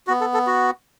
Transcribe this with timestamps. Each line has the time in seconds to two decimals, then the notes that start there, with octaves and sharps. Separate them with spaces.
0.07 B3 F#4
0.21 A4
0.34 A4
0.47 F#4